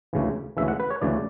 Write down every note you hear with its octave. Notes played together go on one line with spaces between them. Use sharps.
D2 C#3 E3
D2 C#3 E3 E5
F#5
B4
C#5
D2 C#3 E3 D5